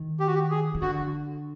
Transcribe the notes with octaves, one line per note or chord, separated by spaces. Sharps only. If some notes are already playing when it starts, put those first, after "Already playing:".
Already playing: D#3
G4
F#4
G4
G#4
D#3
D3 F#4